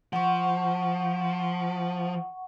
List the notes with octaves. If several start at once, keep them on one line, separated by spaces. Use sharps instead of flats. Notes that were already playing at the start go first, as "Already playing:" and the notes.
F3 F#5 C#6